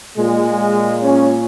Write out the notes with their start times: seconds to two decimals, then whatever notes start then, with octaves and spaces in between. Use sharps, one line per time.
0.17 A#2 G#3
1.02 C#4